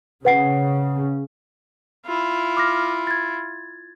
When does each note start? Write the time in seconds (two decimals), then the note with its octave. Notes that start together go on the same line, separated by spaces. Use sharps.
0.25 C#3 B4 F#5 C7
2.05 E4 F4
2.57 D6 F6 A#6
3.07 G#6 A6